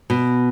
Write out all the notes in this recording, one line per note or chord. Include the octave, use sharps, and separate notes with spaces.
B2